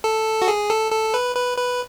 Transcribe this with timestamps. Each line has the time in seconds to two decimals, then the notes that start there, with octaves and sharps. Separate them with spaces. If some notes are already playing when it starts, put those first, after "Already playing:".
0.04 A4
0.42 F#4
0.48 G#4
0.70 A4
0.92 A4
1.14 B4
1.36 B4
1.58 B4